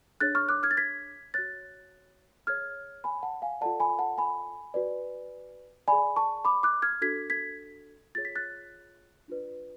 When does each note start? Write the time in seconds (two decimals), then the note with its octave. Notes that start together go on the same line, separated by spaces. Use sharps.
0.20 D4 G#4 C#5 F#6 A6
0.35 C#6 F6
0.49 D6 F#6
0.63 F6 G#6
0.71 A6
0.77 G#6 B6
1.34 F#4 C#5 F#6 A6
2.47 G#4 C#5 F6 G#6
3.04 G#5 B5
3.23 F#5 A5
3.42 F5 G#5
3.61 F4 A4 D5 F#5 A5
3.80 G#5 B5
3.99 F#5 A5
4.18 G#5 B5
4.74 F#4 B4 D5
5.88 G#4 D5 G#5 B5
6.16 A5 C#6
6.45 B5 D6
6.63 D6 F#6
6.82 F6 G#6
7.02 D4 F#4 A4 G#6 B6
7.30 G#6 B6
8.15 F4 G#4 C#5 A6
8.25 B6
8.35 F#6 A6
9.28 D4 F4 B4 D5